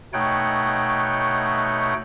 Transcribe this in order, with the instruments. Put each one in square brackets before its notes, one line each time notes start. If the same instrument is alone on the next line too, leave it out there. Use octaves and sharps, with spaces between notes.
[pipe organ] B2 A3 D#4 C#5 F#5 G5